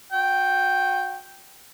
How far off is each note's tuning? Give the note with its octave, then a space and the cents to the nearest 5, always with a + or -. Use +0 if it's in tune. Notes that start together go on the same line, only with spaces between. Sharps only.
F#4 -35 G5 +0